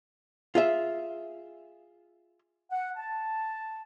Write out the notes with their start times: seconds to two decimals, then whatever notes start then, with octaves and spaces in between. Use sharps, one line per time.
0.55 F4 G#4 E5
2.72 F#5
2.96 A5